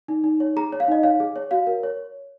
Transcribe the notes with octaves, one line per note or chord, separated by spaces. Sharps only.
D#4
D#4
C#5
G#4 A#5
C#5
F5
D#4 D#5
C#5 F5
G#4
C#5
F#4 F5
A#4
C#5